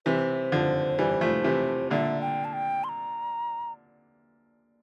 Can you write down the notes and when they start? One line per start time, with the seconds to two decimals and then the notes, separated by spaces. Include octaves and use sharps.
0.06 C3 E3 C5
0.52 D3 F3
0.99 E3 G3
1.21 F3 A3
1.44 C3 E3
1.91 A#2 D3 E5
2.21 G5
2.45 A5
2.53 G5
2.84 C6
2.89 A#5